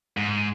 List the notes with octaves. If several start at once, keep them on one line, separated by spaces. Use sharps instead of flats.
G#2